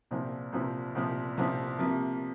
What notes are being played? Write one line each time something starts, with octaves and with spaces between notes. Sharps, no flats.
C2 A#2 F3 C4
C2 A#2 F3 C4
C2 A#2 F3 C4
C2 A#2 F3 C4
C3 F3 A#3